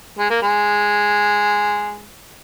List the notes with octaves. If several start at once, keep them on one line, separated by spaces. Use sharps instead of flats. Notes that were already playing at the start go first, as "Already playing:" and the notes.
G#3
A#3
G#3